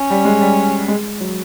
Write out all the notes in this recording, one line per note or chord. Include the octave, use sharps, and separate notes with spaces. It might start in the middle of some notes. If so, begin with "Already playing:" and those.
Already playing: C#4
G3
G#3
G3
G#3
F#3